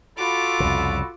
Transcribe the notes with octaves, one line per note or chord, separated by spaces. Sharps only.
F4 F#4 A4 B5 D6
C2 F2 C#3